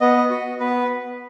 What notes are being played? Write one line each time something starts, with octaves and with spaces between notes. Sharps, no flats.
B3 D#5
F#4
B3 B4